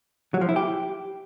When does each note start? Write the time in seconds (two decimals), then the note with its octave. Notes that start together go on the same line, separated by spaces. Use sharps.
0.34 F#3
0.41 F3
0.49 E4
0.56 G4